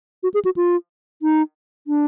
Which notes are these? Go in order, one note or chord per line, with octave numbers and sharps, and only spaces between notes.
F#4
G#4
F#4
F4
D#4
D4